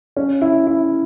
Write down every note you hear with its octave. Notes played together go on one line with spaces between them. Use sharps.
C#4
E4
E4